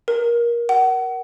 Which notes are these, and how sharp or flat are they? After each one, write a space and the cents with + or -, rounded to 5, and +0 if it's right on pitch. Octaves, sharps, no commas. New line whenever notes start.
A#4 +20
F#5 +30